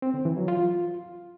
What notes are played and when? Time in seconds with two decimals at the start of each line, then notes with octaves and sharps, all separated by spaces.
0.02 C4
0.14 D3
0.25 E3
0.37 F#3
0.48 F4